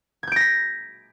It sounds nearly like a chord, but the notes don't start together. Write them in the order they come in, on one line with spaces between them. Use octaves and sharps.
G#6 G6 D7 A#6 B6